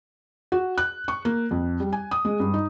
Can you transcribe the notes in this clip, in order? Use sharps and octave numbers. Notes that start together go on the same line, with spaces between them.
F#4
F#6
C#6
A#3
F2
G3
G#5
D#6
G#3
G2
D#4